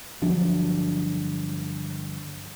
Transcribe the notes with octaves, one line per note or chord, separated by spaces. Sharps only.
G1 F3 F#3 D4